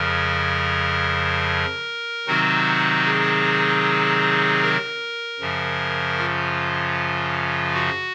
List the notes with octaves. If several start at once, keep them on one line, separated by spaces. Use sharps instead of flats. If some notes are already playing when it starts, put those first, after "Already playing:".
Already playing: F2 C#3 F3 A#4
C3 D#3 F#3 C4 D#4 F#4
G#4
A#4
F#2 C#3 F3
F4
F#4